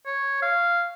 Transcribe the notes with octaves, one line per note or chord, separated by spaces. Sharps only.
C#5
F5